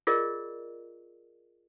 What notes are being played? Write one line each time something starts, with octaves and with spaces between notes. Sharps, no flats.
F4 G#4 A#4 D5 D#5